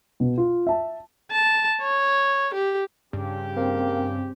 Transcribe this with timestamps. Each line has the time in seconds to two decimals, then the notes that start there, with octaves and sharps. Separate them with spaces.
0.20 B2
0.38 F4
0.67 E5 A5
1.32 A5
1.82 C#5
2.54 G4
3.13 G2 C#3 G4
3.56 A#3 C4